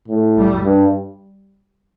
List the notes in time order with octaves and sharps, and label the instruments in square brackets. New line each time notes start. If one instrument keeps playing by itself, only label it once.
[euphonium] A2
[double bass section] G3
[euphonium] G2